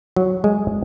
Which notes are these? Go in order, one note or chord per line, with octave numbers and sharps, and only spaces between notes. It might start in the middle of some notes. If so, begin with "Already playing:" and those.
F#3
G#3